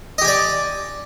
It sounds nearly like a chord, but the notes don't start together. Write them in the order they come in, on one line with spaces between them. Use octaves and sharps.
D#5 G4 G#5 D5